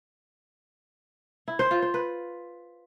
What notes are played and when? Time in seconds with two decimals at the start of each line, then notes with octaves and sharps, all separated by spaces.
1.48 E4
1.59 C5
1.71 F4
1.82 C5
1.94 B4